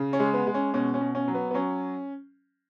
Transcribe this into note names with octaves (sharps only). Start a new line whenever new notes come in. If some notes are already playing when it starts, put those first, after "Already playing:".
Already playing: C#3
C#4
G#3
B3
G#3
C#4
B2 C#4
C#4
B2
C#4
F#3
B3
B3
F#3 C#4